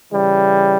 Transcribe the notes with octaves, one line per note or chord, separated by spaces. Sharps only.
C#3 E3 G3